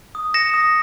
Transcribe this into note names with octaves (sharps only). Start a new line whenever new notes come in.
D#6
A#6 C#7 E7
D#6